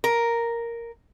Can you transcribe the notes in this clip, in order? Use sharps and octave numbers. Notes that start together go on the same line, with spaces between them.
A#4